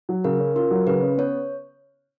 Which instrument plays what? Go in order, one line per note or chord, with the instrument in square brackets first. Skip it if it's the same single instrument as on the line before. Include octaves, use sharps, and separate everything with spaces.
[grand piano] F#3
[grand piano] C#3 [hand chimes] A#4
[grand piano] C#4
[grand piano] F4 [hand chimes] A#4
[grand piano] F#3
[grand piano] C#3 [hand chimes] B4
[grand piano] C#4
[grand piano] B3 [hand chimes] C#5